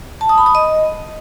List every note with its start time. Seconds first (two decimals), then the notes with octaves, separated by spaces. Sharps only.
0.21 A5
0.29 D#6
0.38 B5
0.46 D#6
0.55 D#5